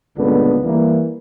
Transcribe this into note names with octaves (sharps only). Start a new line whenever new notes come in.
C#2 G2 A#2 D3 B3
E3 G3 A#3